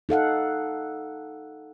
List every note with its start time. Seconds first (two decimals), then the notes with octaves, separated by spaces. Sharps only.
0.09 D#4 A4 F5 F#5